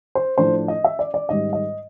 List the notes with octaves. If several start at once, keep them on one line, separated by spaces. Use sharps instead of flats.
C5
A2 F3 A3 D4 C5
D#5
E5
D5
D5
G#2 D#3 G3 D#5
D#5